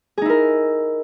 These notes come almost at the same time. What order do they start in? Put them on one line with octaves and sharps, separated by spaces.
G#4 D#4 E4 A#4